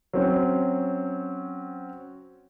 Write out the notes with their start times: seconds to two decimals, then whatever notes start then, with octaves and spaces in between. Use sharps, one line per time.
0.13 F#3 C4 C#4